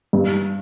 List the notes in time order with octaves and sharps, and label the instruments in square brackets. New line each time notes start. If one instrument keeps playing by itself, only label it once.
[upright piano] G2